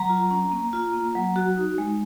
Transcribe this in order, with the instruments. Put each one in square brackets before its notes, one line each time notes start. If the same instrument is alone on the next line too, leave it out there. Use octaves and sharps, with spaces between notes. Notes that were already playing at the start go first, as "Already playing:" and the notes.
Already playing: [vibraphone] F#3 A#5
F4
C#4
A#3
F4
A#3
F#3
F#4
D#4
G#3